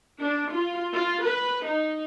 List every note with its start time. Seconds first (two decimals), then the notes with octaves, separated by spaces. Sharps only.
0.20 D4
0.52 F4
0.93 F4
1.24 B4
1.67 D#4